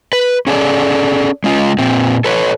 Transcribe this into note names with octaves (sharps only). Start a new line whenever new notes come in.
B4
C#4 G#4 A4 D5
G#3 C#4 F4
A#2 C4
A4 B4 C#5